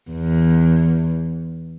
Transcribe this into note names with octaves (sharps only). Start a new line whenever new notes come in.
E2